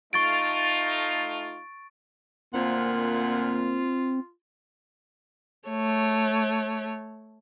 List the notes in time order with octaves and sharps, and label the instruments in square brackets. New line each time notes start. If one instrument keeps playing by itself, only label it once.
[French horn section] A3 D#4 F4 [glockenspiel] C#6 A6 D7
[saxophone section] D2 A#2 F#5 [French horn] A#3 [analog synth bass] C4 [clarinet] F4
[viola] A3 C#5